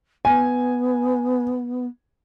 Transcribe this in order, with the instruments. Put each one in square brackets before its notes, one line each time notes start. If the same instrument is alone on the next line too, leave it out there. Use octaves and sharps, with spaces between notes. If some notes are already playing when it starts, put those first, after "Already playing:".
[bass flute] B3 [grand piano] G#5